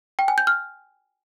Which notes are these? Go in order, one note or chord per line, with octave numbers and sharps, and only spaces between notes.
G5
G#5
G6
F6